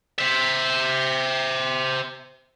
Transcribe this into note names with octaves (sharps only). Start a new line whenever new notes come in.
C5 E5